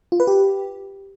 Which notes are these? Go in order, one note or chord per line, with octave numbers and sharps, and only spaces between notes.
F4
B4
G4